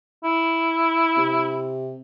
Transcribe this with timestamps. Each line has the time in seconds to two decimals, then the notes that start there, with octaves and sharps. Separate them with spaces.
0.24 E4
1.17 C3